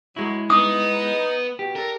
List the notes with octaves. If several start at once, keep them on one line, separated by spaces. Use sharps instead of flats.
A2 F#3 G#3 E4
B3 D#4 D#6
B2 G4
D4 A4 A#4